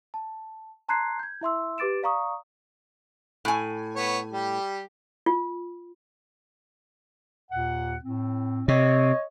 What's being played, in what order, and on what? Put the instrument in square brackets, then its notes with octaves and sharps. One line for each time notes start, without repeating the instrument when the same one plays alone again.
[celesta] A5
A5 A#5 C6 F#6 G#6 C7
G6 G#6
E4 E5 C6 E6
G4 B4 D6 A6 D7 E7
D5 F5 A#5 C#6 D#6
[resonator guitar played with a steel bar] A2 G#5
[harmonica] B3 C#5
G3 G4
[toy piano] F4
[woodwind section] D#2 A#2 F#5
A2 C4
[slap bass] C3 [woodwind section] C#5 D#5